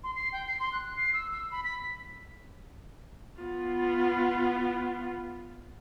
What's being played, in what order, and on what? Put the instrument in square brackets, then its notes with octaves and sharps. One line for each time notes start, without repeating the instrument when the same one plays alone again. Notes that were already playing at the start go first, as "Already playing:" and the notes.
[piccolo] C6
C7
G5
C7
C6
F#6
C7
E6
E6
B5
B6
[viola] B3 F4